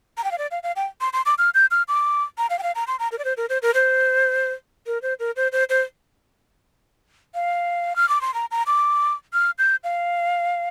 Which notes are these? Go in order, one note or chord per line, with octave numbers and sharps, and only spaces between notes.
A#5
G5
F5
D5
F5
F5
G5
C6
C6
D6
F6
G6
F6
D6
A#5
F5
G5
F5
A#5
C6
A#5
A#4
D5
C5
A#4
C5
A#4
C5
A#4
C5
A#4
C5
C5
C5
F5
F6
D6
C6
A#5
A#5
D6
F6
G6
F5